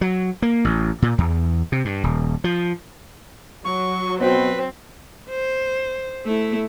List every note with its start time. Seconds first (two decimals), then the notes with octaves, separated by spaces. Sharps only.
0.01 F#3
0.42 A#3
0.65 A1
1.02 A#2
1.18 E2
1.72 C3
1.85 G2
2.04 D#1
2.44 F3
3.64 F#3 C#6
4.20 B2 C4 B4
5.29 C5
6.25 A3 E4